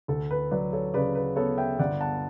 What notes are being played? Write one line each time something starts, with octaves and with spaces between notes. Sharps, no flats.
D2 A4
B4
F#3 B4 D5
A4 C#5
C#3 B4 D5
B4
B3 A4 C#5
E5 G5
G1 D5 F#5
F#5 A5